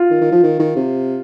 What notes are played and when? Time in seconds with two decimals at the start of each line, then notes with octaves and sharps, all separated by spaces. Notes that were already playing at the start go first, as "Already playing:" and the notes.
Already playing: F4
0.11 D#3
0.21 D#3
0.32 F3
0.43 D#3
0.60 D#3
0.76 C3